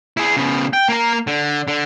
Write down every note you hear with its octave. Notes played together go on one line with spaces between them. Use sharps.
E4 G#4
C#3 B3
G5
A#3 A#5
D3
D3